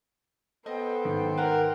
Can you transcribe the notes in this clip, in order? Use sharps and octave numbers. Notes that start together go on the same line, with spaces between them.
B3 A4 C5 D#5 G5
G#1
A#4 B4 F#5